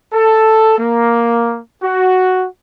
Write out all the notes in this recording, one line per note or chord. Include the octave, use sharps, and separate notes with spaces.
A4
A#3
F#4